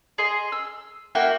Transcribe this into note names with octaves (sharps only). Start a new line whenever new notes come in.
G#4 D#5 C6
E6
A#3 E4 F#4 G5